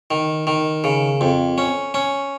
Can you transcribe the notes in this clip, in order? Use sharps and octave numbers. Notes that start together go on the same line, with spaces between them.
D#3
D#3
C#3
F2
C#4
C#4